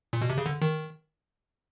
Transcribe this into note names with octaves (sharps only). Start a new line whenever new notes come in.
A#2
B2
C3
C#3
D3
D#3